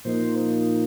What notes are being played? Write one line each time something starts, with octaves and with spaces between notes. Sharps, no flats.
A#2 F3 A#3 D#4 C5